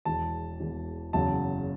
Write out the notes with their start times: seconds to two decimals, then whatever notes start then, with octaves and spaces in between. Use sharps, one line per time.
0.05 E1 E2 E3 A5
0.60 E1 E2 E3
1.13 F#1 E2 C#3 F#3 A5